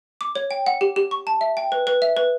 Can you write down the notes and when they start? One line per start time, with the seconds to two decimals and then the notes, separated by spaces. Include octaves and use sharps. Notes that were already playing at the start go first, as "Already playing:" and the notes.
0.21 D6
0.36 C#5
0.51 G5
0.66 F#5
0.81 G4
0.96 G4
1.11 C#6
1.27 A5
1.41 E5
1.57 G5
1.72 B4
1.87 B4
2.02 E5
2.17 B4